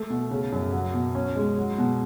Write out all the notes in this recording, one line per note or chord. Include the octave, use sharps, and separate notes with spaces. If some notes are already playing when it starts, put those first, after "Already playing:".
Already playing: A3
B2
C#3
F#2
F#3
B2
C#4
G#3
F#3
B2